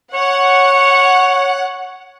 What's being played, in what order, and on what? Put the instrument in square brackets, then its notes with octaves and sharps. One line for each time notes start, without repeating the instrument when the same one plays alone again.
[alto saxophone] C#5 [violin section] F#5